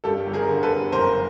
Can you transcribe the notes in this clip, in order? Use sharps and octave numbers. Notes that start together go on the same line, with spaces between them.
G2 G4 A4
G1
G#4 A#4
D3
A4 B4
G1
F#1 A#4 C5